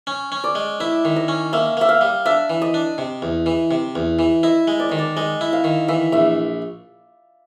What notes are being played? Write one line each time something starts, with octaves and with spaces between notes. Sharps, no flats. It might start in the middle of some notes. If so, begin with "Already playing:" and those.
C#4
C#4
D5
G#3
E4 E5
D#3
D#5
C#4
A#3 E5
A#3 E5
F5
G3
D4 E5
E3
D#5
D4
C3
E2
E3
C3
E2
E3
E4 D#5
G#3
D5
D#3 D#5
D5
G#3 D#5
E4
F5
D#3
E3 E5
A#1 E5